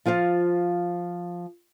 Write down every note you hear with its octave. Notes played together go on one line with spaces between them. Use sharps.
F3 F4 C5 F5